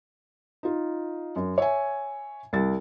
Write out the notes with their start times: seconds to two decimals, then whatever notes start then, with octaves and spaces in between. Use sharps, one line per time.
0.63 D#4 F4
1.36 F#2
1.58 C#5 E5 G#5
2.53 C2 A6